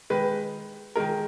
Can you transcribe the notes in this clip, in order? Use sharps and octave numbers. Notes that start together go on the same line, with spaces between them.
D#3 G#3 B4
D#3 G#3 A#4